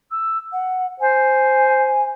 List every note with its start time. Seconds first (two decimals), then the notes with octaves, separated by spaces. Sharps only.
0.11 E6
0.52 F#5
1.00 C5 G#5